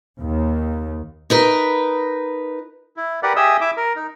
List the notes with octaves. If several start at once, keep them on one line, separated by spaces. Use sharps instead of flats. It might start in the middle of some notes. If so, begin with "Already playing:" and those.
D#2
D#4 A#4 B4
E4
G4 A#4 B4 D5 F#5
G4 G#4 D#5 E5 D#6 E6
E4 E5 D6
A#4
D#4